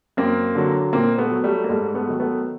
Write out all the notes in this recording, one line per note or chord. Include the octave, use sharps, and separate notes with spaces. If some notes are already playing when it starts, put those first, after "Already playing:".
F#2 A#3 C4
D3 F#3
A#2 A#3 C4
A3 B3
F#3
G3 A3
A#3
G#2 G3 A3
A3 B3
D#3 F#3
A3 B3